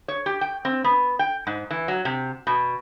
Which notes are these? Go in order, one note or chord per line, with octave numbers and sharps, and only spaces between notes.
C#5
G4
G5
C4
B3
G5
G#2
E3
F#3
C3
B2